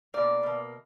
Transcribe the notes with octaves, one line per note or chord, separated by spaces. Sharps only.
B2 A#3 D5
B2 A#3